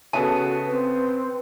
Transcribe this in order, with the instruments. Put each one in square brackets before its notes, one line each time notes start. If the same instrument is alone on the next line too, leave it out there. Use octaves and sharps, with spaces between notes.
[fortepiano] C#3 B3 A4 [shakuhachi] F#4 [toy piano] A5
[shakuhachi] C4 [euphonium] B4